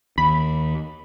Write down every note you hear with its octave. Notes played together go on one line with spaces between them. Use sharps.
D#2 B5